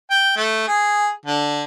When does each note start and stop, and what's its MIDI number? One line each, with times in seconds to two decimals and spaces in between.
0.11 0.35 79
0.36 0.64 57
0.67 1.09 68
1.26 1.63 50